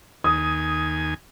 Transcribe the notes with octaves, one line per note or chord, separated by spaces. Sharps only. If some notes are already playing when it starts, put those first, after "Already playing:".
D#2 G#5 D#6